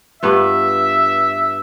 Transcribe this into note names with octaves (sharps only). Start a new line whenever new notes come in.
G2 B3 F4 E5